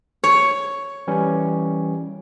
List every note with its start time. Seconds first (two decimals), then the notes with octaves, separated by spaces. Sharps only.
0.24 C#5
1.07 E3 G3 C#4